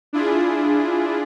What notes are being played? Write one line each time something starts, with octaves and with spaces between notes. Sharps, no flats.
D4 E4 F4 G#4